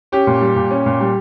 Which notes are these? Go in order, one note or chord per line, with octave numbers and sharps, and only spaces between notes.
C#4 G4
A#2
G3
A#2
C#4
A#2
G3